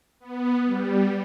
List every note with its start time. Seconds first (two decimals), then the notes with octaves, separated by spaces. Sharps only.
0.20 B3
0.65 G3